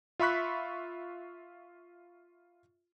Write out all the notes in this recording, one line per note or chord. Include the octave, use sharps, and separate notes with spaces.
F4 E5 B5 C#6 F#6 B6